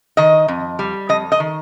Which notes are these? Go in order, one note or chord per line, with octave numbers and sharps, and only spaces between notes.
D#3 D#5
F2
G3
F2 D#5
D#5
D#3